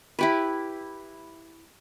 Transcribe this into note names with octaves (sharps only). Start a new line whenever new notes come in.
E4 G4 B4